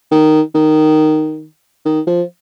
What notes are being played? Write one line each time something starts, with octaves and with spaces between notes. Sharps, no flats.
D#3
D#3
D#3
F3